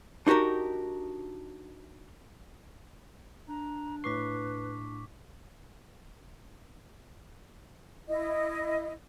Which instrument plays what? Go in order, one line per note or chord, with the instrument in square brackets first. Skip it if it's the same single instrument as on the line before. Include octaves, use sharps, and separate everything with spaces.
[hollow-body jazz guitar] D4 D#4 F#4 G4 A#4
[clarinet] D4 [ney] A#5
[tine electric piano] A2 C7 [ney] B4 [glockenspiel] C#6 D6 B6
[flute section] E4 D#5